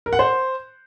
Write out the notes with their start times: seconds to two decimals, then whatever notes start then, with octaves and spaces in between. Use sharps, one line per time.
0.06 A#4
0.13 F#5
0.19 C5